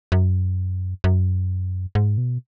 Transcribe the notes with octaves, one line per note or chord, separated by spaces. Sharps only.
F#2
F#2
G#2
B2